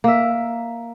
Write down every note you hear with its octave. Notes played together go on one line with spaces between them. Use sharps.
A#3 E5